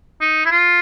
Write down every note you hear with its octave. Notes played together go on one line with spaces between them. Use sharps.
D#4
E4
F4